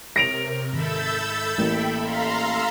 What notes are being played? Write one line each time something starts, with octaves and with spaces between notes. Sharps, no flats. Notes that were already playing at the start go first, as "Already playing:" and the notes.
C3 A#4 C#5 A#6 D7 F7
G#2 D#3 A4 E5 B5 E6 G6 A6
A1 A#3 G5
F5 A#5 C6